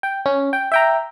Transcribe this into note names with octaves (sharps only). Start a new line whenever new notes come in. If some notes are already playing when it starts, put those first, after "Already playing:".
G5
C#4
G5
E5 G5 A#5